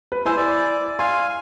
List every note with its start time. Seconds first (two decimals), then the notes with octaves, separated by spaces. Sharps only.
0.12 B4
0.25 E4 C5 G#5 E6
0.37 D5
0.99 F5 G#5 C6